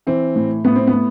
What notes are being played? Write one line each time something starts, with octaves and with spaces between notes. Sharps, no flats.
E3 C4
A2
A2 B3
C4
B3
A2